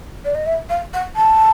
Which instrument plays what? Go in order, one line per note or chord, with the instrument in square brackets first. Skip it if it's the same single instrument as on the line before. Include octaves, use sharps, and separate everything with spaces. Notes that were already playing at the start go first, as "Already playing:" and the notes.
[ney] D5
D#5
E5
F5
F#5
A5